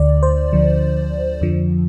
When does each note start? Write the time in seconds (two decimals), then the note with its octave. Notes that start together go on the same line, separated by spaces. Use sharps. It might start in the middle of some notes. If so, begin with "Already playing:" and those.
Already playing: D2 D3 D5
0.23 C5
0.53 D2 D3 F3
1.41 F2 D3 F3